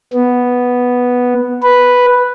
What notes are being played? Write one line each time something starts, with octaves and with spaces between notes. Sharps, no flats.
B3
B4